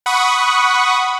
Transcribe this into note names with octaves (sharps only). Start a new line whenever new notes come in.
F#5 B5 C#6 D#6